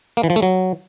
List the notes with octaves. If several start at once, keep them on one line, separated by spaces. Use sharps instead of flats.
A#3
E3
F3
A3
F#3